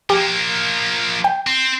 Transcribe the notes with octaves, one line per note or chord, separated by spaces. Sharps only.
F3 A#3 G4
G5
C4